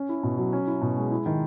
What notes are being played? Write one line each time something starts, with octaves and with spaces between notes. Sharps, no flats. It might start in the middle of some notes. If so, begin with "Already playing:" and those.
Already playing: C#4
E4
B2
F#3
C#4
E4
B2
G#3
E4
D#3